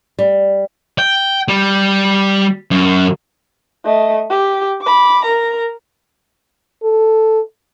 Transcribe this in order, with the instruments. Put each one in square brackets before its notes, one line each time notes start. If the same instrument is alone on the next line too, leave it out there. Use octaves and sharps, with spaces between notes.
[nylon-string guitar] G3
[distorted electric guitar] G5
G3
F#2
[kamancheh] A3 D#5
G4
B5 D6
A#4 A#5
[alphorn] A4